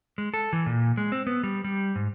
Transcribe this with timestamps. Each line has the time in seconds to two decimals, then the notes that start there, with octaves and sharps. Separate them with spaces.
0.18 G#3
0.34 A4
0.53 E3
0.66 A#2
0.97 G#3
1.12 C4
1.27 B3
1.43 G3
1.64 G3
1.95 G#2